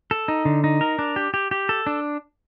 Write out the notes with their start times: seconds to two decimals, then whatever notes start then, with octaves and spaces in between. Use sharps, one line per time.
0.11 A4
0.28 D#4
0.45 D3
0.64 D#4
0.81 A#4
0.99 D4
1.16 G4
1.34 G4
1.51 G4
1.69 A4
1.87 D4